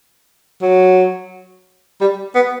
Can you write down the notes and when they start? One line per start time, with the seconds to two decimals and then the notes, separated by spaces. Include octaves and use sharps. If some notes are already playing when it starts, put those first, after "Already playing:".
0.62 F#3
2.01 G3
2.35 B3